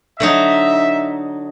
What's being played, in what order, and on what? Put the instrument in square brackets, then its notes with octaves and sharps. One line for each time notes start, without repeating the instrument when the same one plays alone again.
[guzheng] D3 F#3 D#4 [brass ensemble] E5